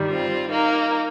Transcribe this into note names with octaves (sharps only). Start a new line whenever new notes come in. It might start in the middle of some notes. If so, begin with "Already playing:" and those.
Already playing: G2 D#3 G3
C4 F4
A#3 D#4